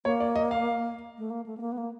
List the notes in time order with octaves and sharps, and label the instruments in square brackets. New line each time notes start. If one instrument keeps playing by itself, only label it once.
[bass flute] A#3 [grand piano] C#5
[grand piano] D5
D#5
F5
[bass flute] A3
A#3
A3
B3
A#3
B3
A#3